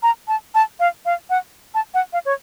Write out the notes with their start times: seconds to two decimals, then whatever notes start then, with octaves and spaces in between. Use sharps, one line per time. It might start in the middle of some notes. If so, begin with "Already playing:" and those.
0.03 A#5
0.28 A5
0.55 A5
0.80 F5
1.05 F5
1.30 F#5
1.74 A5
1.94 F#5
2.13 F5
2.26 C#5